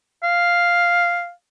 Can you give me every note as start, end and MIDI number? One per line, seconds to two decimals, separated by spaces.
0.23 1.32 77